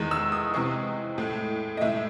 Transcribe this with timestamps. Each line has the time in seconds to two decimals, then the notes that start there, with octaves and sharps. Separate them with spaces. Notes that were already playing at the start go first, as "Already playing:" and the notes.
Already playing: E2 D#3 G#3
0.11 E6
0.32 D#6
0.54 C3 E3 G#3 C#6
1.18 A2 G#3
1.77 D#5
1.81 A2 G#3 E5